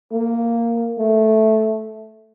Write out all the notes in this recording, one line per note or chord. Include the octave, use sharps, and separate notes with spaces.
A#3
A3